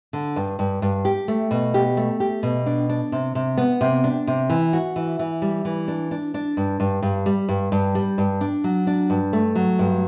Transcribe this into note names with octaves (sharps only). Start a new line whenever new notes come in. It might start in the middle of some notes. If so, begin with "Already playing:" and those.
D3
G2
G2
G2
G4
A3
B2
G4
A3
G4
B2
D4
D4
C3
C3
B3
C3
D4
C3
E3
F#4
E3
E3
G3
E3
D4
D4
D4
G2
G2
G2
G3
G2
G2
G3
G2
D4
F#3
D4
G2
A3
F#3
G2